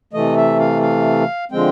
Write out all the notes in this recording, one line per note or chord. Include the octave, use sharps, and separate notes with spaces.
C3 E3 A3 D#5
E5
F5
F5
D3 F3 G#3 C4 G5